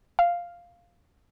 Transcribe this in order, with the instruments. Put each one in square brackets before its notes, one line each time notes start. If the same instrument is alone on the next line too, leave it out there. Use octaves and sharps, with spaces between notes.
[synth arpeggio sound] F5